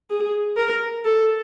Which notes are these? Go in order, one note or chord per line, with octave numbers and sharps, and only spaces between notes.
G#4
A#4
A4